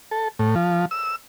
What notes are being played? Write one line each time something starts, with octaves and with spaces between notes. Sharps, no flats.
A4
A2
F3
E6